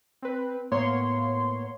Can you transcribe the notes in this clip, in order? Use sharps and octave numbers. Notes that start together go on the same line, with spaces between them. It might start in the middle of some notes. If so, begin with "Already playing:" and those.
C4 B4
A2 A#3 B3 C#5 C6